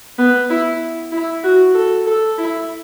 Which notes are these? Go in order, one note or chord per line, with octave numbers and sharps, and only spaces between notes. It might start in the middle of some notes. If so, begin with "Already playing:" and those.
B3
E4
E4
F#4
A4
A4
E4